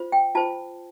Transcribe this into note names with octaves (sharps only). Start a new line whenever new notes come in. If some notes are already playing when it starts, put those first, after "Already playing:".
Already playing: F4 C5
G5
F4 C5 A5